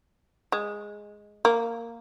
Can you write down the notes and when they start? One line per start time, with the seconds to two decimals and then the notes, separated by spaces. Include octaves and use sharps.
0.52 G#3
1.45 A#3